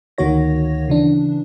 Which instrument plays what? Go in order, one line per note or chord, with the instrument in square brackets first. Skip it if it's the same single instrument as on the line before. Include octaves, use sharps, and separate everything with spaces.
[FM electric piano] D2 D#3 A#3 F#4 C#5 A#6
C#3 E3 D4